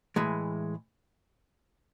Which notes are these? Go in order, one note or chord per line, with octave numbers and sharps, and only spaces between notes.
A2 E3 G#3